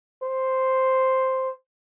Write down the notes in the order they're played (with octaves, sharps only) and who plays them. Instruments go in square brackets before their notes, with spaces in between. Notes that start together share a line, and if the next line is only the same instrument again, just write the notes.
[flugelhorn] C5